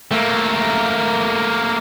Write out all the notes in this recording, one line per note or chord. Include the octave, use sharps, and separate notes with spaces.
A3 A#3